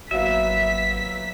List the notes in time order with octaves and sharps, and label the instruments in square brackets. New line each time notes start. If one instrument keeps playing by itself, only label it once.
[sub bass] G#1 [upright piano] F#3 A#3 B3 [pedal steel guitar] E5 [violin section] B6